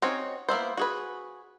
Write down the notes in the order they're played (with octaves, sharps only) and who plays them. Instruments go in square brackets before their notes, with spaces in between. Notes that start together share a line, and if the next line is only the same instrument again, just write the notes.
[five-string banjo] C4 C#4 D#4 F#4 C#5
A#3 B3 E4 C5
F#4 G#4 B4